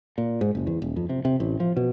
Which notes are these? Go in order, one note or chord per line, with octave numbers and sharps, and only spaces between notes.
A#2
G#2
F#1
E2
D#1
F2
C3
C3
A1
F3
B2